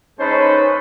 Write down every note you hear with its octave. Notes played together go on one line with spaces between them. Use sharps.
G#2 C#4 D#4 A4 B4 C5